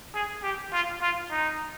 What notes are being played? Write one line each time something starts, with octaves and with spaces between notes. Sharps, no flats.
G#4
G4
F4
F4
D#4